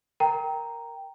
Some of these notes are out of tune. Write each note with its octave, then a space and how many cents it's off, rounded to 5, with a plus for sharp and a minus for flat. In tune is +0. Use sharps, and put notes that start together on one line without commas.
A#4 +0 G5 +0 A#5 +0